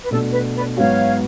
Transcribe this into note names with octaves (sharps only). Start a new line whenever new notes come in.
B4
B2 A3 D4 A4
B4
B4 D5
G#2 F#3 B3 F#4 C#5 F5